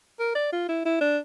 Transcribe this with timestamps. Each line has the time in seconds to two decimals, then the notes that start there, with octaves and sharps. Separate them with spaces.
0.19 A#4
0.35 D5
0.52 F4
0.69 E4
0.85 E4
1.01 D4